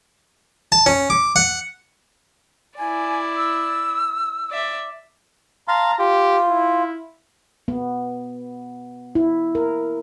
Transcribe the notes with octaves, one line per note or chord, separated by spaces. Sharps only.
A5
C#4
D6
F#5
E4 D5 G#5
E6
D5 E5
F5 A5 A#5 C6
F4 G4
E4
B3
E4
A#4